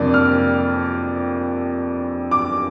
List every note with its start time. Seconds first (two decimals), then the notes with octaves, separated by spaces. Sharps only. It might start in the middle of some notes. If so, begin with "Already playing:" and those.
Already playing: F2 C3 G3 A#3 D4 D5
0.14 F6
2.31 D6